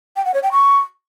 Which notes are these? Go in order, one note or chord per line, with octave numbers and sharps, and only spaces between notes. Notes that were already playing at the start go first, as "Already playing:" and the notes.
G5
F#5
C#5
G5
C#6